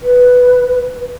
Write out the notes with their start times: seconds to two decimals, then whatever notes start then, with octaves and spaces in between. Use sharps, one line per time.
0.03 B4